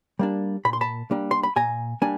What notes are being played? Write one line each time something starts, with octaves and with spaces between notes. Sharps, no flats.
G3 A#3 D4
A#2 B5
C6
A5 B5
G3 A#3 D4
C6
B5
A#2 G#5 A#5
G3 A#3 D4 G#5